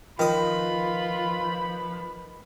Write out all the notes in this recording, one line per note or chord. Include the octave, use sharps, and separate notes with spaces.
D#3 F3 F4 B4 B5 D#6